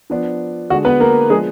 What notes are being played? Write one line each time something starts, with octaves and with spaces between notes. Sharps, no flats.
F3 B3 D4
D3 G#3 D4 F#4
B3 B4
A#3 A#4
F3 G#3 B3 D4 G#4